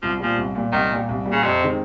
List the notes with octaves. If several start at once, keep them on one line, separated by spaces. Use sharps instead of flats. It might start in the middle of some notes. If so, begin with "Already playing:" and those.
C2 F3
A#2 F3 G3
C2
A#2 G3
C2 D#3
A#2 G3
C2
A#2 G3
C#3
F2 C3
D#3 G#3 C4